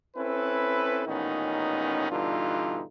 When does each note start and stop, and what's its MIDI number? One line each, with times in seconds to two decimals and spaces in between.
0.16 1.03 60
0.16 1.03 61
0.16 1.03 64
0.16 1.03 69
0.16 1.03 71
1.06 2.08 33
1.06 2.08 46
1.06 2.08 51
1.06 2.08 59
1.06 2.08 61
1.06 2.08 63
2.10 2.82 43
2.10 2.82 47
2.10 2.82 50
2.10 2.82 52
2.10 2.82 63
2.10 2.82 65